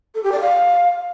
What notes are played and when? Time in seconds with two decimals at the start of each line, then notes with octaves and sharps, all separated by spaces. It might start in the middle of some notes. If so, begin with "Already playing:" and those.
0.15 A4
0.23 G4
0.32 D5
0.41 F5